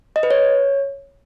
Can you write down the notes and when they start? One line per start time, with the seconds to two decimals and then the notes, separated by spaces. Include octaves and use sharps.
0.16 D#5
0.23 B4
0.31 C#5